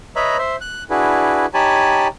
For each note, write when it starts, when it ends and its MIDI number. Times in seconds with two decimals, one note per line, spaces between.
0.16 0.37 71
0.16 0.37 73
0.16 0.37 75
0.16 0.37 76
0.16 0.37 82
0.16 0.37 83
0.38 0.56 72
0.38 0.56 76
0.61 0.83 90
0.90 1.46 62
0.90 1.46 64
0.90 1.46 66
0.90 1.46 68
0.90 1.46 71
1.54 2.08 63
1.54 2.08 67
1.54 2.08 73
1.54 2.08 80
1.54 2.08 81
1.54 2.08 83